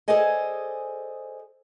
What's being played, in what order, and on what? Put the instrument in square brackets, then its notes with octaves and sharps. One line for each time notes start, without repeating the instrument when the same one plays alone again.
[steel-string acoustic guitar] G#4 A4 C5 D5 D#5 G#5